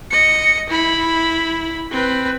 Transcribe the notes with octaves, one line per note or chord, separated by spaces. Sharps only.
D#5 C#7
E4 B5
C4 B4